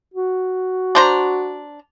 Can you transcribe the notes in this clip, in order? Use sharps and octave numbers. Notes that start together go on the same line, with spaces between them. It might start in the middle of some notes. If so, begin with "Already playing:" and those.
F#4
D4 C5 A#5